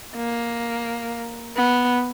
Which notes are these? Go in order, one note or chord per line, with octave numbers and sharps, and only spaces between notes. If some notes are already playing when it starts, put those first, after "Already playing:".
A#3
B3